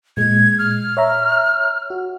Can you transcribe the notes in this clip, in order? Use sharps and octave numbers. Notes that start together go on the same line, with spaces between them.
A#2 G#3 G#6
F6
C#5 E5 A#5
F#4